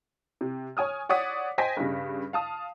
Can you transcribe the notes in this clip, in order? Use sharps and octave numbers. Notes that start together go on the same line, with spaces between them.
C3
C#5 G#5 D#6 F6
C#5 D5 F#5 D6 D#6 B6
C5 D#5 G5 G#5 A#6 B6
G2 C#3
F5 A5 D#6